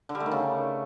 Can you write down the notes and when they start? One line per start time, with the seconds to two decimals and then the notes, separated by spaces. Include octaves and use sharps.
0.09 D3
0.15 G3
0.20 A3
0.26 D#3
0.31 C#3